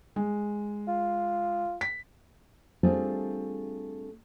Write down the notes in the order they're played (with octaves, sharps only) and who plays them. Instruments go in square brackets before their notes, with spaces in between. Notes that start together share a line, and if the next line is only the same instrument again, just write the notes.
[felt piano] G#3
[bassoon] F4
[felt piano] B6
[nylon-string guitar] G3 A3 C4 D4 F4 G#4